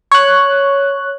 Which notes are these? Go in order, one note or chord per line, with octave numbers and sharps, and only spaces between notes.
C#5 F#6